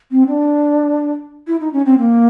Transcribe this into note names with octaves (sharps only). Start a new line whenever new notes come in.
C4
D4
E4
D#4
C#4
C4
A#3